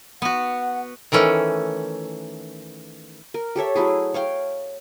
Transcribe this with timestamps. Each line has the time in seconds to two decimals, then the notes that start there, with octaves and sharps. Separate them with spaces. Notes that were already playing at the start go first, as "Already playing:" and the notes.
0.22 B3 F#4 F#5
1.12 D#3 E3 A3 C#4
3.34 A#4
3.56 G4 A4 C#5 E5
3.75 F#3 A3 E4 G#4
4.14 C#5 F5 G5